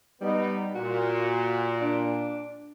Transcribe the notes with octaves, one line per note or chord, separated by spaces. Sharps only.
G3 B3 D#4
A#2 F#4
D4